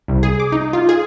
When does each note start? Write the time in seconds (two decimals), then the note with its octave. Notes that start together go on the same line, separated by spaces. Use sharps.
0.08 C2
0.23 G#4
0.40 D6
0.52 D#4
0.73 F4
0.89 G#4